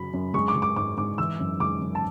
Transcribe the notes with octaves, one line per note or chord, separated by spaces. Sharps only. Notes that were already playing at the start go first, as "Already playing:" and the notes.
Already playing: F#2 C#3 F#3 B5
F#2
G#3 C#6
D6
G#3
D6
G#2 D6
G#2 D6
E3 E6
F#2
G#3 D6
F#2
A5